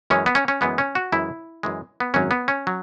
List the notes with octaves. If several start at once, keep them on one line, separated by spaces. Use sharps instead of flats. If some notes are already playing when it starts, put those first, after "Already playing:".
F#2 E3 G#3 C#4
B3
C#4
C#4
F#2 E3 G#3 B3
C#4
F#4
F#2 E3 G#3 E4
F#2 E3 G#3
B3
G#1 F#2 F#3 C#4
B3
C#4
F#3